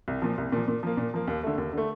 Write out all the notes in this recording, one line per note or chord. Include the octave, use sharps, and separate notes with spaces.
C2
A#2 F3
C2
A#2 F3
A#2
F3 A#3
A#2
F3 A#3
D#2
D3 A3
D#2
D3 A3